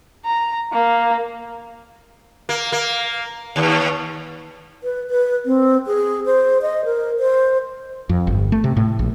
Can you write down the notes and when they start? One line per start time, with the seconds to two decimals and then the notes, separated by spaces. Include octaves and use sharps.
0.25 A#5
0.72 A#3
2.49 A#3
2.72 A#3
3.56 D#2
4.84 B4
5.10 B4
5.46 C4
5.87 G#4
6.26 C5
6.62 D#5
6.85 A#4
7.20 C5
8.09 F2
8.27 G1
8.52 A3
8.64 C3
8.77 A2
8.99 A#1